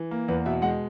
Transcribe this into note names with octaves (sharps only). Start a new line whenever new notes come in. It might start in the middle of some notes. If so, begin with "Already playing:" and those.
Already playing: E3
A#3
E2 B4
B2 E5
G#3 F#5